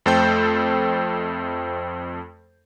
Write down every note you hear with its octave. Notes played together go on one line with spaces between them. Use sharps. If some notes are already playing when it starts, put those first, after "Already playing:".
F2 A3 A4 C5 G5 G6